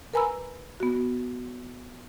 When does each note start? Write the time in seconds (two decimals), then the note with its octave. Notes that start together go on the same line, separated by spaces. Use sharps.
0.14 A#4 B4 G#5 A#5 B5 E6
0.80 B3 F#4